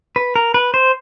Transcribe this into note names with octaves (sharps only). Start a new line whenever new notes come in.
B4
A#4
B4
C5